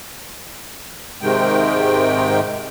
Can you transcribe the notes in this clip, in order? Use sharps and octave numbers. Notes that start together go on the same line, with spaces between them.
G#2 C3 D#3 G#3 G5